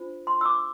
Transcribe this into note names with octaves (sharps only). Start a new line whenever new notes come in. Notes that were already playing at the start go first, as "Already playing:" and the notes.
Already playing: D4 F4 C5
C6
E6
D6